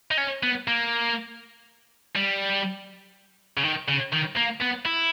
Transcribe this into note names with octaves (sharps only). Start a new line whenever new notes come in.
D#4
C#4
B3
A#3
G3
C#3
D#3
C#3
D#3
A#3
B3
E4